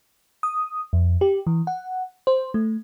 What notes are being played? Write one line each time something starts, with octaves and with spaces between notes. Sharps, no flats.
D#6
F2
G4
E3
F#5
C5
A3